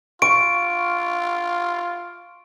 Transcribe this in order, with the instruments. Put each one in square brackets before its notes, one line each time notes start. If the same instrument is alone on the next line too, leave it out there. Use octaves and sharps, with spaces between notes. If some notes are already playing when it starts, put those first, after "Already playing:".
[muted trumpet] F4 [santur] C#6 [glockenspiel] D7